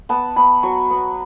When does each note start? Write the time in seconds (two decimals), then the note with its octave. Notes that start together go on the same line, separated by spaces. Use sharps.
0.09 B3 A5
0.36 B3 B5
0.63 F#3 C#6
0.90 B3